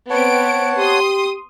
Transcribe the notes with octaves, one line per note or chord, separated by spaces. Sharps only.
B3 C4 C#5 F#5 A5 D7
G4 C6 D#6